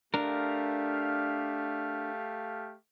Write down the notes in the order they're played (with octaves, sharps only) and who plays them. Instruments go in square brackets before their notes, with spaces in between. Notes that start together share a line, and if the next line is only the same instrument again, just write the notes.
[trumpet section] A3 G4 F5 [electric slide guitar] D4 A#4